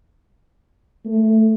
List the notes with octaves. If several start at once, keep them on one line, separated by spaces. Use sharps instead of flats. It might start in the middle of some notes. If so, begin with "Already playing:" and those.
A3